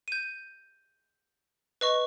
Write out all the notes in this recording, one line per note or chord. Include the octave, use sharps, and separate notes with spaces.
G6 D#7
B4 D#5 C#6